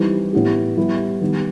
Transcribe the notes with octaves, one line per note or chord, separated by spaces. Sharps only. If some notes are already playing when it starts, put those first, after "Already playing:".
Already playing: E3 G3 C4 D#4
A2 E3 B3 E4 G4
G3 B3 E4 G4
D#3 G3 B3